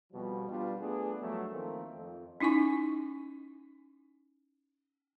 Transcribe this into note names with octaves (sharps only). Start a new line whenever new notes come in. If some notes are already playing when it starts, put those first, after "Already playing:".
F2 B2 F3 G3
G3 B3 D4 F4
A3 B3 D4 G#4
G2 F3 F#3 A3 B3
D#3 F3 A3 A#3 C4
F2
C#4 D#4 E4 G#5 C#6